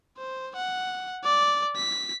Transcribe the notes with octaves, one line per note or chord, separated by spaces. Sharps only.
C5
F#5
D5
B6